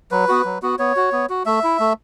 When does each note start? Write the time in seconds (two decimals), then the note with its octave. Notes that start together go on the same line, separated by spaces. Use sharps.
0.11 F#3 B4
0.28 B3 F#4
0.45 F#3
0.62 B3 F#4
0.79 B3 C#5
0.96 F#4
1.12 B3
1.30 F#4
1.46 A3 E5
1.64 E4
1.80 A3